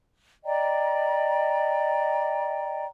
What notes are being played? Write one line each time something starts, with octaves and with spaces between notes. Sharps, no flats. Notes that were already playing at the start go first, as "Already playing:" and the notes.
D5 D#5 G5 A#5